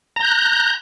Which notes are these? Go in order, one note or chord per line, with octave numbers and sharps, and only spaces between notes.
A#5 F#6 G6